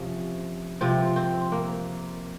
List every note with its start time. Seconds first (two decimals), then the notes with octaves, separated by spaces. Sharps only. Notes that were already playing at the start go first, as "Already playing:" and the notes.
Already playing: C3 F3 C#4
0.81 C3 F3 C4
1.16 C4
1.52 A#3